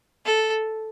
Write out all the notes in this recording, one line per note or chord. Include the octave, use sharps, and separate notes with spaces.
A4